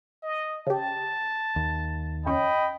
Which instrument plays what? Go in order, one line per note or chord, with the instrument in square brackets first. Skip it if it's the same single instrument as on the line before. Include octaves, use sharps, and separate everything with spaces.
[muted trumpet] D#5
[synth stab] C#3 G4 [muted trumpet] A5
[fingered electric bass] D#2
[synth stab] F2 C#4 [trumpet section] D#5 G5 B5